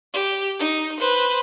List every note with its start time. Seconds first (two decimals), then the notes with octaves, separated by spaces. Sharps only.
0.13 G4
0.60 D#4
1.00 B4 C5